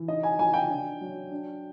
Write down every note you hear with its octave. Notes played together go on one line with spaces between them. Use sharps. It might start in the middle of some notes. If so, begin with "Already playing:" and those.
Already playing: E3
D#4 D#5
G#5
F3 G#5
G5
D4
F#3
D4